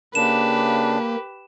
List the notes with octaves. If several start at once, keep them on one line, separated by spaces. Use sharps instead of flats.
C#3 A#3 D4 G4 B4 E7